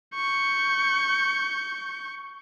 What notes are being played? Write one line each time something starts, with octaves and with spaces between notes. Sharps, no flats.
C#6 G6